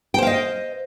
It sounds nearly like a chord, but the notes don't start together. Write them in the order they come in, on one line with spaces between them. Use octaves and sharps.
G5 C5 F5 D#5